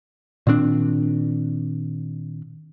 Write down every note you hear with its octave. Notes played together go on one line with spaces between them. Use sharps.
A#2 D#3 C4 D4